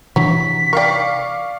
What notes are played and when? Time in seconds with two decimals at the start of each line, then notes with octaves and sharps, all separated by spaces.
0.16 C3 E3 F#3 D4 B6
0.73 A#4 D5 F5 G5 C#6